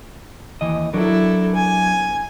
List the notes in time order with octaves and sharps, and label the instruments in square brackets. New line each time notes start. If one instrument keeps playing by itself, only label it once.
[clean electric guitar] D#2 E3 D#5
[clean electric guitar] F#3 D4 A#4 [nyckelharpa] E4 A4
[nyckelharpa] G#5